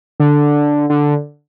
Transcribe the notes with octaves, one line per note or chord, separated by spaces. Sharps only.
D3
D3